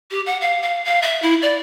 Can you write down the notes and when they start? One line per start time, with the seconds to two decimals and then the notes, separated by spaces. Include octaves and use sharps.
0.11 G4
0.26 F#5
0.41 F5
0.62 F5
0.85 F5
1.02 E5
1.22 E4
1.42 D5